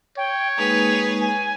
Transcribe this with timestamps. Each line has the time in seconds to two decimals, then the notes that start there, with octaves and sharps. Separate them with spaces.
0.17 C#5 G5
0.58 G#3 A#3 D#4 G#4 B4 F7
1.21 G#5